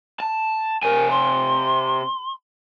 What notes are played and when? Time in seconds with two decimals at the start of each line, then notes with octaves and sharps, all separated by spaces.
0.20 A5
0.83 C3 A#4 G#5
1.10 C6